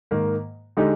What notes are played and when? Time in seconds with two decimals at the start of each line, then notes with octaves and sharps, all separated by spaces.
0.11 G#2 D#3 A#3
0.77 D3 G#3 D#4 G4